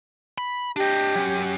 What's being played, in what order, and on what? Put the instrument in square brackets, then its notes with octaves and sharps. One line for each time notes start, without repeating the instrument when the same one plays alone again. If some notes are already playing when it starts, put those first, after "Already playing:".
[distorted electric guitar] B5
[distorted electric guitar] D4 D#5 [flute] G4
[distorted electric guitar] F#3 C#4